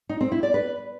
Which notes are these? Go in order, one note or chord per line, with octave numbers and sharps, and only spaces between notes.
D#4
C4
E4
D5
B4